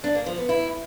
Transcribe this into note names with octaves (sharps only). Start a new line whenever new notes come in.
D4
A#3
F3
B3
E4